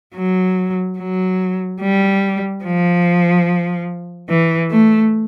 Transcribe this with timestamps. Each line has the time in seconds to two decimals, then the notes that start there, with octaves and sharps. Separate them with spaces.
0.15 F#3
0.98 F#3
1.81 G3
2.64 F3
4.29 E3
4.71 A3